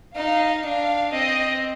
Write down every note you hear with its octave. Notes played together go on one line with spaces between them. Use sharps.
D#4 F5
D4 F5
C4 D#5